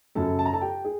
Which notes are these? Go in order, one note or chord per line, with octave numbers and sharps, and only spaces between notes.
F#2 C#3 F#3 A4 A5
A5
A#5
A4 A5
G4 G5
G#4